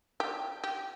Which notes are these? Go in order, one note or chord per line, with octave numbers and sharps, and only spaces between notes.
G4
G4